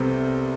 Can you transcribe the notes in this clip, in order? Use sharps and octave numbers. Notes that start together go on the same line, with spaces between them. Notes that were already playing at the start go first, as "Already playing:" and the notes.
Already playing: C2 C3 B3 A4 C5